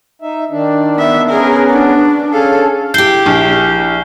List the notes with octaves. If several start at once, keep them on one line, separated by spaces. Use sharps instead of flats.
D#4 E5
D#3 D4
B3 E5
B3 C#4 G#4 A#4
D4
C#4 G#4 A4 F5
E4 G4 G6 C7 G7
A#1